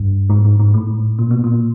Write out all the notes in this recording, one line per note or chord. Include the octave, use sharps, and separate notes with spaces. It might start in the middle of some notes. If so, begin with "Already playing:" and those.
Already playing: G2
G#2
G#2
G#2
A2
A#2
B2
A#2